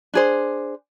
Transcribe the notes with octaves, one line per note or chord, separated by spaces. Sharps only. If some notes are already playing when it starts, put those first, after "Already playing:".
D4 G#4 C5